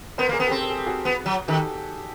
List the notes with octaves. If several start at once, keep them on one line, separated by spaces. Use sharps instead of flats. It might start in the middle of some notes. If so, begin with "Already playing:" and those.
B3 A#4 C5
A#3 G#4 A#4
B3
C4 G4 A4
A4
G#4
G4
F#4 G#4
B3
F#3
D#3 G4 A4